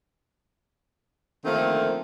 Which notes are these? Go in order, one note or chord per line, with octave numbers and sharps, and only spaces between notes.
D3 D#3 F3 A3 A#3 C4